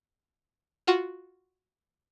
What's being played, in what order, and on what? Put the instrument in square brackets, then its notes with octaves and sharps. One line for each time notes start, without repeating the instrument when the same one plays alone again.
[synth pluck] F4 F#4